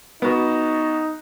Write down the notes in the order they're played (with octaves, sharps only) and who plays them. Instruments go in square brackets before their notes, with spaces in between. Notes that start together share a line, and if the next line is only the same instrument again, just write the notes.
[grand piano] B3 F#4 [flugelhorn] D#4